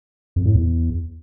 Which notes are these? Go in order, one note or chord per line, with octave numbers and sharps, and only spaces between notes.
F2
A2
E2